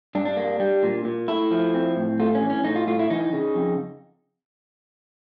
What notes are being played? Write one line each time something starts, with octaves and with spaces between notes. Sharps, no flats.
G2 D4
D4
A#3
G3
A#2
A#2
A3 E4
F3
C4
A2
A3 F4
C#4
E3
C#4
A2 D#4
F4
A2 F4
E4
E3 D#4
C#3
F2